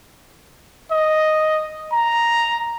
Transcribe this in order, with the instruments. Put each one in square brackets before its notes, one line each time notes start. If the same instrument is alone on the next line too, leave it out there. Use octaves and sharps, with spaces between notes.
[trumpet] D#5
A#5